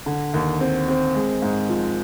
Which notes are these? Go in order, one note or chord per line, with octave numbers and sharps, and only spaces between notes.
D3
D#2
C4
C4
G#3
G#2
F3